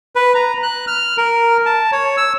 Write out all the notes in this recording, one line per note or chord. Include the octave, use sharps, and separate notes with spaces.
B4
A#5
F#6
F6
A#4
A5
C#5
E6